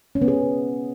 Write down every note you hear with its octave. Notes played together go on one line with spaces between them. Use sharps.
C#4
B3
G#4